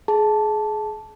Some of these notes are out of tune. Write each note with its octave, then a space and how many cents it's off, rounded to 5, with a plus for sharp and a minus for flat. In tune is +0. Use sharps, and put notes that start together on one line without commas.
G#4 +25 A5 -5